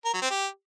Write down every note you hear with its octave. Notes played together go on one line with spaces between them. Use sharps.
A#4
F#3
C4
G4